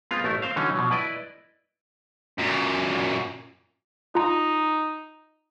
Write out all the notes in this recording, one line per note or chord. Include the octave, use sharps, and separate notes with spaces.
G#3 B3 C4 F4 F5
A1 A3 E4 A#4
C4 C5 F5
D3 E3 F#3 C#4 D#4
B2 F3 F#3
E4 B4 D5 D#5
F#2 A#2
D#4 F4 A#5